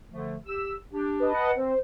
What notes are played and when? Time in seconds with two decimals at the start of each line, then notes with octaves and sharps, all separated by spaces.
0.11 D3 F3 A3
0.46 G4 E6
0.92 D4 G4
1.20 B4 D#5 A5
1.34 F#5
1.57 C4 C5